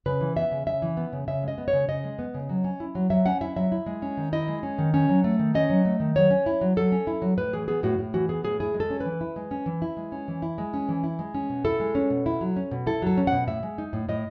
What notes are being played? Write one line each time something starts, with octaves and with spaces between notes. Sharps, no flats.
C#3 B4
E3
B3 E5
C#3
C#3 E5
E3
B3
C#3
C#3 E5
G#3
D#5
B3
C#5
C#3
C#3 D#5
G#3
B3
C#3
F#3
C#4
E4
F#3
F#3 E5
C#4 F#5
E4 E5
F#3 E5
E4
G#3
C#4
D#3
E4 D#5
G#3
C#4
D#3
C#4
F#3
A3
D#3
C#4 D#5
F#3
A3
D#3
F#3 C#5
C#4
E4
F#3
F#3 A4
C#4
E4
F#3
A2 B4
E3 G#4
B3 G#4
A2 F#4
A2
E3 F#4
B3 G#4
A2 G#4
E4 G#4
G#3
A4
C#4
E3 B4
E4
G#3
C#4
E3
E4
G#3
C#4
E3
E4
G#3
C#4
E3
E4
G#3
C#4
B2
E4 A4
G#3
C#4
B2
E4
F#3
C#4
B2
E4 A4
F#3 A4
C#4
B2 F#5
A2 E5
G#3
D#4
A2
A2 D#5